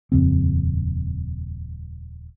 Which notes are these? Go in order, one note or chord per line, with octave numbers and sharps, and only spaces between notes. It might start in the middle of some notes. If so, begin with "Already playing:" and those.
D#1 F2 C#3 C4